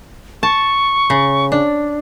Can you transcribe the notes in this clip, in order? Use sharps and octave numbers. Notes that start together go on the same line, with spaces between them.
A5 C#6
C#3
D4